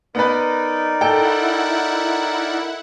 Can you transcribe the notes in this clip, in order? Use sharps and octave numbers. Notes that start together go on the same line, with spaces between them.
B3 D#4 A#4 B4 D5
E4 A4 F#5 G5